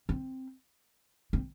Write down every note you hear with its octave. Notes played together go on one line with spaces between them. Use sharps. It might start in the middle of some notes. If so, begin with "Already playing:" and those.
C4
C4